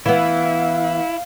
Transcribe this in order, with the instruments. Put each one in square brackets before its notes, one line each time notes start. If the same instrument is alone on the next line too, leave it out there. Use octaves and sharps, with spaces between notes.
[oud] E3 B3 [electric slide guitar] E4 [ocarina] F5